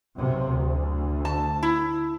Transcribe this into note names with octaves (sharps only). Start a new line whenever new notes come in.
B1 F#2 C3
D2
A5
E4